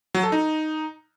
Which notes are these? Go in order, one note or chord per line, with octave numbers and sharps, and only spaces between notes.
F#3
A4
D#4